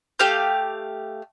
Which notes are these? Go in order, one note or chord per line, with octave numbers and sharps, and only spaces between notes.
A3 G4 F5 G6